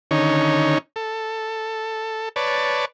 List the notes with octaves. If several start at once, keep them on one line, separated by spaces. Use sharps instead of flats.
D3 D#3 C#4 D#4 C#5
A4
B4 C#5 D5 A5